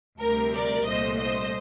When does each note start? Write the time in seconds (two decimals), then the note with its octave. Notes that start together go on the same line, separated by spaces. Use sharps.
0.19 D2 C3 G3 A#4
0.51 A#4 D5
0.84 C2 A#2 A3 C5 D#5
1.17 C5 D#5